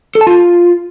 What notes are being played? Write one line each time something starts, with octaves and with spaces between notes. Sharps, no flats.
A4
A5
F4